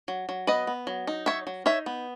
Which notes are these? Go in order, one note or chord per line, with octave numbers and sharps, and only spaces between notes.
F#3
F#3
B3 B4 D#5
B3
F#3
D#4
F#3 C#5 E5
F#3
D#4 C#5 E5
B3